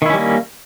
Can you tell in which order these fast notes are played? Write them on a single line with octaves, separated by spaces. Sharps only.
D#3 E4 C#4 G3 A#3